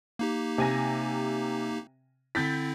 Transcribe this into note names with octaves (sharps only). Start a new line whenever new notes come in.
A#3 D#4 G4
C3 G#5 A#6
D3 C4 E4 G6 A6 B6